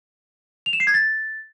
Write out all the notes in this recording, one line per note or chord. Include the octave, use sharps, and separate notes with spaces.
F7
E7
C7
G#6
A6